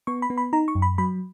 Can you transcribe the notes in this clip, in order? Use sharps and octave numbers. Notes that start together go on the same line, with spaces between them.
B3 C#6
B5
B3
B5
D#4 A#5
C#6
F#2
B5
F#3 B5